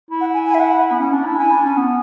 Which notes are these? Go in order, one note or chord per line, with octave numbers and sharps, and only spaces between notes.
E4
F#5
G#5
G#5
E5
F#5
B3
C#4
D4
E4
E4 G#5
D4
C#4
B3